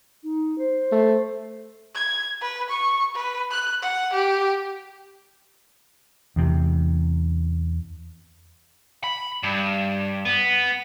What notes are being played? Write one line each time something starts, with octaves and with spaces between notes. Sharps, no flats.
D#4
C5
A3
G#6
B4
C#6
B4
F#6
F#5
G4
E2 C3
B5
G2
B3